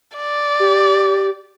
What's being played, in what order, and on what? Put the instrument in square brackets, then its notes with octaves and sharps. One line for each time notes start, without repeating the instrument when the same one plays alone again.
[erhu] D5
[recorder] G4